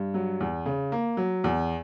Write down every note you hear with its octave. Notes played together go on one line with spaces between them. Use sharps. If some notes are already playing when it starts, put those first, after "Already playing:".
Already playing: G2
F#3
E2
C#3
A#3
F#3
E2